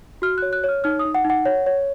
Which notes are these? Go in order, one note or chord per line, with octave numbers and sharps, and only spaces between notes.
F#4 F6
F#6
C#5
F#6
C#5 F6
D#4 F6
D#6
D#4
F#5
D#4
F#5
C#5
C#5